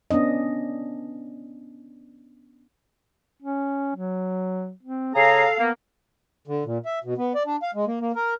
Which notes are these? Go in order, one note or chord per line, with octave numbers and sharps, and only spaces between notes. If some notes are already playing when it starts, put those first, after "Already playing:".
B3 C#4 D4 D#5
C#4
F#3
C4
C#3 G#4 A4 F5 A#5
A#3 B3
D3
A#2
E5
B2
B3
D5
D4
F5
G#3
A#3
A#3
A#4